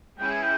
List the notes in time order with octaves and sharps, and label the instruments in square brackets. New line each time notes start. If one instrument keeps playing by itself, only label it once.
[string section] E3 G#3 C#4 E4 G#4 [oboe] G5
[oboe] G#5
G5